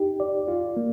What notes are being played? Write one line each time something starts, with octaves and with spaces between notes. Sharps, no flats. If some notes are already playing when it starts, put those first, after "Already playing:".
Already playing: D#4 G4
D5
F4
A#3